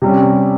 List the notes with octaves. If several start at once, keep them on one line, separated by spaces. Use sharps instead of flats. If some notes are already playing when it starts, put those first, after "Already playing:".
C3 G3 C#4